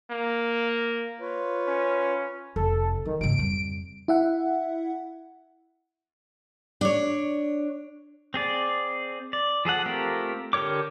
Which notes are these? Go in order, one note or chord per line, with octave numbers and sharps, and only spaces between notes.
A#3
F4 B4 C#5
C#4
F1 A4
D#3 F3
G#1 C#3 D7
F2 G3
E4 E5 F#5
D4 C#5
C4 G#4 D5
D5
F3 G#4 A4 F#5
A3 C4 F4 G4 A#4
D3 G4 A#4 C#5 D6